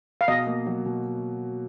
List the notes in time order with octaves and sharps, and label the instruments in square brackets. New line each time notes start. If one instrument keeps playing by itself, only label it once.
[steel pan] F5
[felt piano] B2 [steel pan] D#5
[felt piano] A#3
F#3
B2